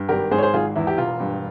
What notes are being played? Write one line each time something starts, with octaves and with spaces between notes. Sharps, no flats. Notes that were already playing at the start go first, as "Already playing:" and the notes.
Already playing: G2
G#1 G4 A#4
G#2 G#4 C5
C#5
G#4 C5
G#1 F4 G#4
E2 E4
G4
E1 F4
G2